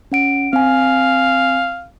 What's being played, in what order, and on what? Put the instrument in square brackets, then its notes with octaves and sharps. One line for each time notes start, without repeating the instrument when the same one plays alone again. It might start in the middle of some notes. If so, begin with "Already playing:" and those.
[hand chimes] C#4 F#5 D7
[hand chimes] C4 G#5 [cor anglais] F5